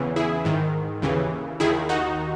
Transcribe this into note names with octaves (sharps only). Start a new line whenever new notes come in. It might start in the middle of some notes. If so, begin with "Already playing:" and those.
Already playing: E2 C#3 E3
E4 G#4
G#2 D#3
D#2 C#3 E3
D#2 D#3 E4 G#4
D#4 F#4